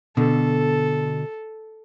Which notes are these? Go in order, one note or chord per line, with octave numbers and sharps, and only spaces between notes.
B2 D3 A4